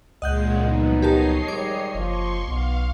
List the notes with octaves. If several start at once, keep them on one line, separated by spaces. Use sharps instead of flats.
C#2 A#2 C#3 G#3 D#5 F#5 G6
F3 F#3 B3 D#4
G4 A#4 C#5 D#5 A5 C7
G#2 D#3 G3 D6
F#1 F3 C6 C#6
B1 B2 F5